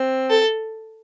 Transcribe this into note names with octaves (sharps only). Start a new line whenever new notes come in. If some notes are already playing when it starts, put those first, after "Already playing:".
Already playing: C4
A4